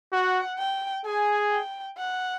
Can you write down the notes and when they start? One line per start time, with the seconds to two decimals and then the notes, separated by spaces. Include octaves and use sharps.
0.13 F#4 F#5
0.59 G5
1.06 G#4 G#5
1.51 G5
1.98 F#5